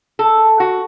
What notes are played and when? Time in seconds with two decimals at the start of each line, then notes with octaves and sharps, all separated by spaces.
0.19 A4
0.60 F#4